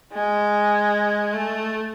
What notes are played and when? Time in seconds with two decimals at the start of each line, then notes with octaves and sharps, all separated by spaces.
0.12 G#3
1.33 A3